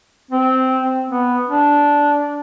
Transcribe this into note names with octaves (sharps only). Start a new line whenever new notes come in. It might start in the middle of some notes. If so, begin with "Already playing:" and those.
C4
B3
D4